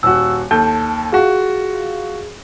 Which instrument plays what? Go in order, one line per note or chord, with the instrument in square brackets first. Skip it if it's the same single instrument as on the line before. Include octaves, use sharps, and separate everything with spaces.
[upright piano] D#1 F#4 [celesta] E6
[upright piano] D#2 A4 G6 [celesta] A5
[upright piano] F4 F#4 [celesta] G#4